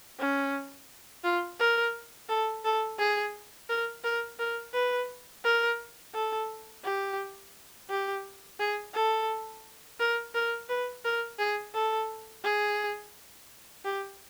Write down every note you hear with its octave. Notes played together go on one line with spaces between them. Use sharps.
C#4
F4
A#4
A4
A4
G#4
A#4
A#4
A#4
B4
A#4
A4
G4
G4
G#4
A4
A#4
A#4
B4
A#4
G#4
A4
G#4
G4